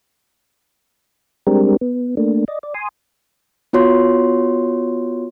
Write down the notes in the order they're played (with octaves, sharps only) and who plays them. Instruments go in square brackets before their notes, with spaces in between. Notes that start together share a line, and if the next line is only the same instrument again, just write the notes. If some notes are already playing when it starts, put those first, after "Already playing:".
[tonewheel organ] G3 G#3 C4 D4 G4 A#4
B3
A3 A#3 D4
D5 D#5
D5
G#5 C6 D#6
[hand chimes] B3 F4 F#4 C#5 C6